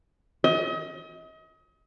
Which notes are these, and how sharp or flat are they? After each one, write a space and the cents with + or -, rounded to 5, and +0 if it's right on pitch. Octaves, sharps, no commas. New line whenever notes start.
D#5 +35